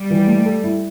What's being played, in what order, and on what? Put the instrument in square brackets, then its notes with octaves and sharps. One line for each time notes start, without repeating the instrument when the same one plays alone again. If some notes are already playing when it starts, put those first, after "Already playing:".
Already playing: [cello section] G3
[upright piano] E3
A3
A4
E4